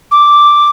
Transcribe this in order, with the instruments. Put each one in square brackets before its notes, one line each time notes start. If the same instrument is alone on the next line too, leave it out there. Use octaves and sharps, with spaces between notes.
[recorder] D6